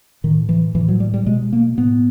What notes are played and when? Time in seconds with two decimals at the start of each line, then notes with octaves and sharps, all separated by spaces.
0.24 A2 D#3
0.49 E3
0.75 A2 E3
0.88 F#3
1.00 G3
1.14 G3
1.26 B2 G#3
1.53 A#3
1.78 A2 B3